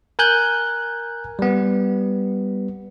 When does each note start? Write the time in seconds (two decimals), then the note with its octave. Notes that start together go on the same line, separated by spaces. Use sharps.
0.19 A#4 G#5 F#6 G6
1.39 G3 B3